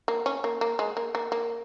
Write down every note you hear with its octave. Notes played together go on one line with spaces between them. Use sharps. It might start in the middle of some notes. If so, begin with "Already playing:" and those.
A#3
C#4
A#3
A#3
G#3
A#3
A#3
A#3